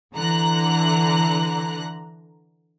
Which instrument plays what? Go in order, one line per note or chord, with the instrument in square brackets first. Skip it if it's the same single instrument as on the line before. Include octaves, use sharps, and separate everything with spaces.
[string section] D3 E3 A#5 F#6